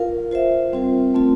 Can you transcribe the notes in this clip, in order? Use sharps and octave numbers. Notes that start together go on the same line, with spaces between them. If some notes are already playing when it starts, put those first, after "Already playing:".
Already playing: F4 A#4 F5
F4 C5 E5
G3 C4 F4 A#4
A3 C4 F4